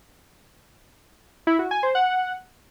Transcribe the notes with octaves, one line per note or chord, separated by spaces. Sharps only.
E4
F#4
G#5
C5
F#5